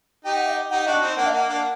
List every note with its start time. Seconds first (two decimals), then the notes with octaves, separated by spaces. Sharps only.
0.25 D#4 G4 G5
0.37 F#5
0.48 D#5
0.71 D#4 G4 F#5
0.82 F#5
0.86 D4 F#4 D#5
1.02 C4 D#4
1.17 A#3 D4 F#5
1.27 D#5
1.33 A#3 F#5
1.49 A#3 D4